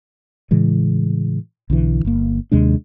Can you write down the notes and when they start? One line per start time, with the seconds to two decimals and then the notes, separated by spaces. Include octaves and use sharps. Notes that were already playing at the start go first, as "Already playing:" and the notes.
0.51 A2 C#3 E3 G#3
1.70 B1 D3 E3
2.05 G1 A#3
2.52 D#2 C3 G#3 D4